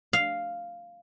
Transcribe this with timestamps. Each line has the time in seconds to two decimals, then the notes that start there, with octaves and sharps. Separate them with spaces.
0.13 F5